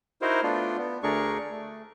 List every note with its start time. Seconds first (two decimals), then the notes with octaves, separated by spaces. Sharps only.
0.22 D#4 E4 F#4 A#4 C5
0.43 A3 B3 D4 F4
0.78 B3
1.03 D2 A3 D4 G#4 A#4 C#6
1.51 A3